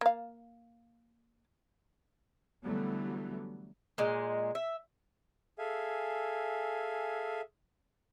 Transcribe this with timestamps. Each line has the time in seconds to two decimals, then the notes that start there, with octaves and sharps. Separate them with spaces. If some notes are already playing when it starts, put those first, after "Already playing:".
0.01 A#3 F5
2.64 D3 E3 F#3 G3 A3 B3
3.98 A#2 G#3
4.55 E5
5.59 G#4 A4 E5 F5 G#5